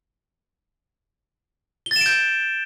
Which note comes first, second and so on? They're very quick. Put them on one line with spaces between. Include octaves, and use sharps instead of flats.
G7 A6 E7 D7 G6